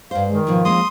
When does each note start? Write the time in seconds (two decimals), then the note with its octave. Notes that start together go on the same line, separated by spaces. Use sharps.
0.11 G2 C5 F5
0.28 D#3 G#3
0.47 G#2 B2 F3
0.65 G#3 A#3 C#4 C6 D#6